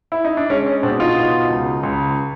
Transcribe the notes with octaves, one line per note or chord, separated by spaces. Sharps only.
E4
D#4
D4
G#3 C#4
C#4
B2 C4 D4
D#4 F4
B2
C#2
C#2